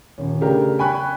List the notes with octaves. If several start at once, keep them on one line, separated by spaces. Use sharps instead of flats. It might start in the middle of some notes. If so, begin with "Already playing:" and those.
D#1 C#4
C#3 A3 D4 G4 A#4
G5 G#5 B5 C#6 F#6